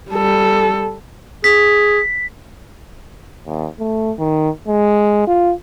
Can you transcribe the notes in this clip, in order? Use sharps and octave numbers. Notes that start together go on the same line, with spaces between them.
G3 A4
G#4 B6
D#2
A3
D#3
G#3
F4